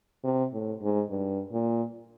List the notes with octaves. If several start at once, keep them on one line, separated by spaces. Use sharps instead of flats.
C3
A2
G#2
G2
A#2